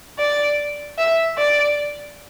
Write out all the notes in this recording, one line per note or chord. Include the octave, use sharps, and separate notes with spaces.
D5
E5
D5